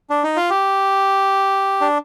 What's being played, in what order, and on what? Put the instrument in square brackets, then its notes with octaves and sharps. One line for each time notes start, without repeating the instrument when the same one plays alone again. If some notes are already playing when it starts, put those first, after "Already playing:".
[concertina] D4
D#4
F4
G4
D4